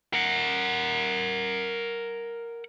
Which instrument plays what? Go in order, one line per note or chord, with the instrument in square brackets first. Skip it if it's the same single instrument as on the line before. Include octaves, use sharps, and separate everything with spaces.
[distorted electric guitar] A#4 F#5